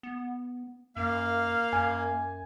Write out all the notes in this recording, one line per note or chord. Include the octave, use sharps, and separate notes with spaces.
B3
F#2 A#3 F5
F#2 G#5